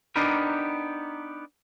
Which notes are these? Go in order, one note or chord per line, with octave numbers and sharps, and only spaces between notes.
B3 D4 D#4 G4 A#4 B4